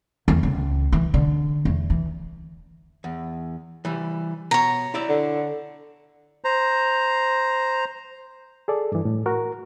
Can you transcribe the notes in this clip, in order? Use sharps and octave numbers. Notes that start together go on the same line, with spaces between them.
E2
C#2
E3
D3
E2
E3
E2
E3 G3
B2 C#5 A#5
E4 D5 E5
D3
C5 A#5
G#4 A4 D5
G2 E3
A2
F#4 A#4